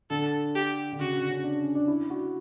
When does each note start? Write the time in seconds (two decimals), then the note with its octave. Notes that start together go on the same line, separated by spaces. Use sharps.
0.10 D3 A4
0.55 G4
0.93 D3
0.99 C#3 F#4
1.14 D3
1.29 C#4
1.43 D4
1.62 C#4
1.75 D4
1.88 E4
2.10 F#4